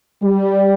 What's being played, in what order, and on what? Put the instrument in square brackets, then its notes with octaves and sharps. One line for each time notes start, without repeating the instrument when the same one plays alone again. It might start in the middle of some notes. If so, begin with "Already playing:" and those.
[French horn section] G3